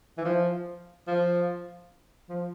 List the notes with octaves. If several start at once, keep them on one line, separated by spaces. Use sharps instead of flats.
E3
F3
F3
F3